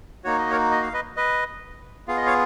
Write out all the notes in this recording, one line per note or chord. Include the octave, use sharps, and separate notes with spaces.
A#3 D#4 F#4 C#5
D#5
A#4 C#5
D#5
F5
B4 D#5
B4 D#5
B3 F4 G#4 F5
D#5
C#5 F5